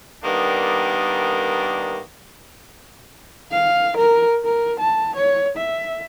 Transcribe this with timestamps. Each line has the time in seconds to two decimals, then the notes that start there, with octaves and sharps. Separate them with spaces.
0.24 D#3 G3 A#3 B3 D4
3.52 F5
3.97 A#4
4.44 A#4
4.80 A5
5.16 C#5
5.57 E5